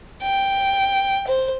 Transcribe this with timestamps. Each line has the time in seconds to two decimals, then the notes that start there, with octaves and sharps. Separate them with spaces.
0.22 G5
1.27 C5